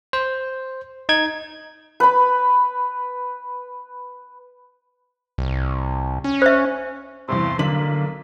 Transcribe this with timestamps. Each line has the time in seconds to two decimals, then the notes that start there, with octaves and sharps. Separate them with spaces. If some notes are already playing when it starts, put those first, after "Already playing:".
0.13 C5
1.09 D#4 G#6
2.00 B4 B5
5.38 C2
6.24 C#4
6.42 C5 E5
7.28 E2 G2 C3 C6
7.59 B1 D3 A#3 B6 F#7